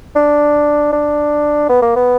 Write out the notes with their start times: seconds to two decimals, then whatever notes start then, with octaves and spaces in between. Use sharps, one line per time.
0.16 D4
0.93 D4
1.69 B3
1.82 A#3
1.96 B3